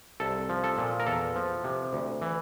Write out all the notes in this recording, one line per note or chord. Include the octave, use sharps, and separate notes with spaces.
C2 A4
F3
A4
A#2
A#4
E2 A4
F3
C3
D2
E3